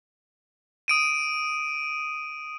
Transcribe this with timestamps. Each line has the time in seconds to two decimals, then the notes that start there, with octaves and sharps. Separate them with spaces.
0.88 D#6 D7 D#7